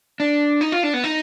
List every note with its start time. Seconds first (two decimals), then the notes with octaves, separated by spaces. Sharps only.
0.20 D4
0.61 D#4
0.72 F4
0.83 D4
0.94 B3
1.04 D#4